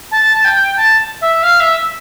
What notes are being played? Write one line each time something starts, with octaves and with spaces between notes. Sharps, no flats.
A5
G5
A5
E5
F5
E5